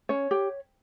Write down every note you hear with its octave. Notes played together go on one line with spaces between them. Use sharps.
C#4 C#5
G4